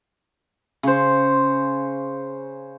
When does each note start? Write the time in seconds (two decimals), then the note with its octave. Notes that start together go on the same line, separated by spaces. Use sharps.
0.83 C#3 C5